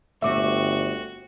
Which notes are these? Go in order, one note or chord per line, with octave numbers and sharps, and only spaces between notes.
G1 A3 C4 F#4 E5 D6